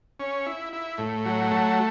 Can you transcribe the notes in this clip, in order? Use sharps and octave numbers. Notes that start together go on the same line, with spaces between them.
C#4
E4
E4
A2
F#3
A3